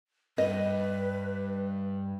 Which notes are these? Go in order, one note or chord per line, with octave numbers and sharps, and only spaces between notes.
G2 B4 D#5